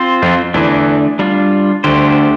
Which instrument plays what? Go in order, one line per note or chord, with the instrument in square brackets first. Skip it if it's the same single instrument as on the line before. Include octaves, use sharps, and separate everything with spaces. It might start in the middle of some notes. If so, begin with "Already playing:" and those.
Already playing: [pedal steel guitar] C4 F4 C5
[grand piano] F2 F3
[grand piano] E2 E3 [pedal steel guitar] D3 A3 D4
[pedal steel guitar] G3 D4 F4
[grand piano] D2 D3 [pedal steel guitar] A3 D4 G4 C5